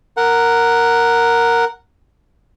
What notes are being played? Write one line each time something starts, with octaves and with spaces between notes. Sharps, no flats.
A#4 F#5